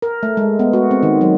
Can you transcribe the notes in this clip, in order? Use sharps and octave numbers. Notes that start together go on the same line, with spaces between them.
A#4
A3
G#3
B3
F#4
C4
D#3
F#3